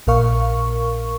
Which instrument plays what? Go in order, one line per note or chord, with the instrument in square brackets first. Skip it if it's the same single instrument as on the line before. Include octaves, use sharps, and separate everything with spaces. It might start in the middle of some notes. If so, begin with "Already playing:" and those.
[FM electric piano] A#1 A#2 A#4 F5 C#6